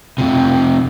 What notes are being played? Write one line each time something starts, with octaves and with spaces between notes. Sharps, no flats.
F2 C3